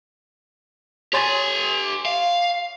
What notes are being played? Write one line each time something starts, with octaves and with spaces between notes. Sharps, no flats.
G4 C#5 G#5 C6 A6
F5